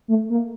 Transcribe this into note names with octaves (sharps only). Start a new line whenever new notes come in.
A3
A#3